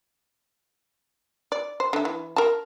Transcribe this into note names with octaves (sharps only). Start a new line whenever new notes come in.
D5
C5
D3 E5
E3
A#4 A5